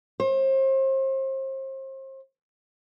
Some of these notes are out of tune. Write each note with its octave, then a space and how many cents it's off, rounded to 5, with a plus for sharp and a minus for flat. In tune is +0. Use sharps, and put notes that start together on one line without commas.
C5 +35